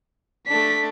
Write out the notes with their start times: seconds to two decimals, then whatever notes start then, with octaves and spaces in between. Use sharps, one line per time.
0.47 A3 D4 B6